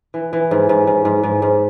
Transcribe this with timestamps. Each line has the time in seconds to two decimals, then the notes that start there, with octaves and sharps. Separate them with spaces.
0.14 E3
0.33 E3
0.51 G#2
0.69 G#2
0.87 G#2
1.05 G#2
1.23 G#2
1.42 G#2